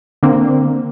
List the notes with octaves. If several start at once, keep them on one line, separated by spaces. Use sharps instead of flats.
D3 A#3 C4